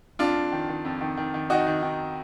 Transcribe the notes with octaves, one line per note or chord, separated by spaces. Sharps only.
F2 D4 F4
F2
D#3
D#3
F2
D#3
D#3
D#3
D#3 D#4 F#4
D#3
D#3